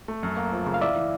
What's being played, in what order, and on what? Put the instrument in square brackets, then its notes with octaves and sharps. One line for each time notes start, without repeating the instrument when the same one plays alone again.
[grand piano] A3
F#2
A#3
F3
C#3
[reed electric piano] F5
[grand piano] E3 [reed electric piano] D5 E5
[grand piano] E3